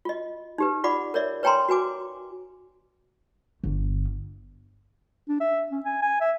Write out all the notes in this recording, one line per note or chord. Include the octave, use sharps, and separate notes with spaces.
F4 D#5
D#4 G4 B4
F4 D5 F#5 B5 D6
A#4 C#5 D5 E5
B4 C#5 G5 G#5 A#5 C6
F#4 B4 G#5 D6
G1
D4
E5
C#4
G#5
G#5
E5